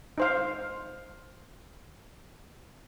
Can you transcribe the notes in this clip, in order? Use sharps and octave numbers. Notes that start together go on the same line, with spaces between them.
D#4 C5 F5